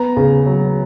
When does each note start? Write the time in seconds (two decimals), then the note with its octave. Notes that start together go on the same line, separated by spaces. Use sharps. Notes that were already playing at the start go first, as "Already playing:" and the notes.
Already playing: B3 A#5
0.17 C#3
0.46 F#3